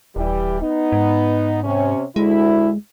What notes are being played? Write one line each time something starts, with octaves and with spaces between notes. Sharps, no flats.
D#1 E3 G3 G4
B3 D#4
G#2
C3 C#4
D2 G#3 E4